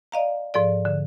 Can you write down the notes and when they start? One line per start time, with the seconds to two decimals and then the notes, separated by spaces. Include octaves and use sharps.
0.12 D5 D#5 F5 A#5
0.54 G#2 F3 A4 D5
0.85 D3